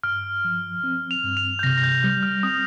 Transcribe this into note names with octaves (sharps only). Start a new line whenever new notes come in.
G2 F6
F3
C4
F7
G2
F7
G6
C3 A#6
A#6
G6
G3 G6
F6
C4 D#6